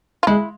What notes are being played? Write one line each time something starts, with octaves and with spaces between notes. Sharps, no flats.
F4
G#3 E4